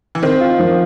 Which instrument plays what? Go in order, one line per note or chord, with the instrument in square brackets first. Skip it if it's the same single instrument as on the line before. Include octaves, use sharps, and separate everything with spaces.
[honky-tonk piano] E3
[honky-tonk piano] D#3 [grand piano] C4
[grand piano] F4
F3